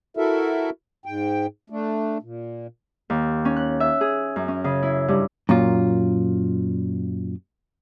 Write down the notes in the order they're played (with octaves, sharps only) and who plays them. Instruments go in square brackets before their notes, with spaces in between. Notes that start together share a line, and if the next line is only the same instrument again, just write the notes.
[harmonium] E4 F#4 A4 A#4 E5
G#2 G5
A3 D4
A#2
[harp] D#2
C#4
F#6
E5
G#4
F#2
C#4
C#3
E4
G2
[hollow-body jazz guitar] F#2 A#2 F4